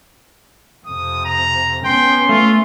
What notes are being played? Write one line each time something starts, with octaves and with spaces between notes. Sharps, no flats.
F2 C3 D#6
A#5
B3 C#4 G5 C6
A3 F4